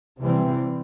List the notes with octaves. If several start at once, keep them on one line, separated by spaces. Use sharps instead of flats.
C3 E3 G3 C4